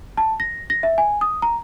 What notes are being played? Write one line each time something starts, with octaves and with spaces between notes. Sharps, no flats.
A5
A#6
A#6
E5
G#5
D#6
A#5